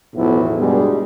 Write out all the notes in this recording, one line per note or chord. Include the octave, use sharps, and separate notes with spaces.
B1 E2 A2 F3 B3 E4
G2 B2 G3 G#3